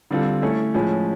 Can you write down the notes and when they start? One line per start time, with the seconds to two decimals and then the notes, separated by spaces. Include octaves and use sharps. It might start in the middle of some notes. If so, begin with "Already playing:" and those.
0.11 D3 G3 C4 F4 A4
0.42 A3 C#4 E4 A4 C#5
0.74 A2 F3 G#3 C#4